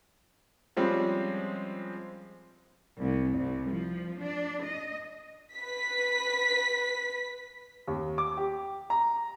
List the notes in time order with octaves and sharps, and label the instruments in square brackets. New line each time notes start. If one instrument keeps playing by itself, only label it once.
[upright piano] F3 G3 G#3 C4 C#4
[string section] C2
C2
F3
D4
D#5
[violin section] B4 B6
[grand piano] D#2
D6
G4
A#5